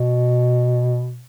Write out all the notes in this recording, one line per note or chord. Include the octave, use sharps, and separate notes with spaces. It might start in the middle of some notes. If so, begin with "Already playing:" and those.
Already playing: B2